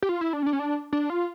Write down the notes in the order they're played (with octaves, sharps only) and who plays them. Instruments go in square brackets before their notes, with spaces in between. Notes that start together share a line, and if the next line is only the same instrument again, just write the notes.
[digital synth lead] G4
F4
E4
D4
C#4
D4
C#4
D4
D4
F4